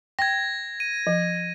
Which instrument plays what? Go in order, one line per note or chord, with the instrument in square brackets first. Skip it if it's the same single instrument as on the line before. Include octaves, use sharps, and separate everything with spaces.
[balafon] G5 [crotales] G#6 A#6
[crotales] D#7
[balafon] F3